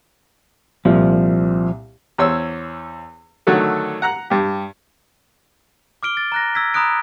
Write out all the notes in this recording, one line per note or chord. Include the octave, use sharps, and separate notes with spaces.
C2 A#2 F3
E2 C5 C#5 E6
D3 D#3 F#3 A3 F#4 A4
F#5 A#5 F#6
G2 G4
D6 F6 D7 G7
A6
A#5 F#6 A#6
E6 G#6 B6
A#5 B5 D#6 F#6 D7